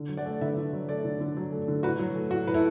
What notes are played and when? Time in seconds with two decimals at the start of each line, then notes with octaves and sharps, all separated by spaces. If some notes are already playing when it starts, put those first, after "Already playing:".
Already playing: D3
0.09 F#3
0.17 D5 F#5
0.25 A3
0.41 D3 B4 E5
0.57 D3
0.73 F#3
0.89 A3 A4 D5
1.05 D3
1.20 D3
1.37 F#3
1.52 A3
1.68 D3
1.83 A2 F#4 B4
1.99 F#3
2.16 A3
2.31 A2 F#4
2.47 A2 B4
2.54 E4 A4